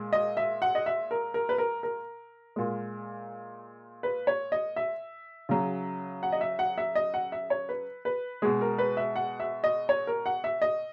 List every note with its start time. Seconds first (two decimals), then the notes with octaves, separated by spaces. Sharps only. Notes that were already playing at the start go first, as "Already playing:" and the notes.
Already playing: A#2 G#3
0.13 D#5
0.37 E5
0.62 F#5
0.75 D#5
0.86 E5
1.11 A#4
1.34 A#4
1.49 B4
1.58 A#4
1.83 A#4
2.56 A#2 G#3
4.03 B4
4.27 C#5
4.52 D#5
4.76 E5
5.49 C#3 F#3
6.23 F#5
6.32 D#5
6.41 E5
6.59 F#5
6.78 E5
6.95 D#5
7.14 F#5
7.32 E5
7.50 C#5
7.69 B4
8.05 B4
8.42 B2 G#3 G#4
8.61 A#4
8.78 B4
8.97 E5
9.16 F#5
9.40 E5
9.64 D#5
9.89 C#5
10.07 A#4
10.26 F#5
10.44 E5
10.62 D#5